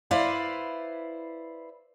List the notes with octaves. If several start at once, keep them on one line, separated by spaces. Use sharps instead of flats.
E4 B4 C5 D5 F5